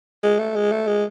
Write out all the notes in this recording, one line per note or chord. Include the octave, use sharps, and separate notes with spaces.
G#3
A3
G#3
A3
G#3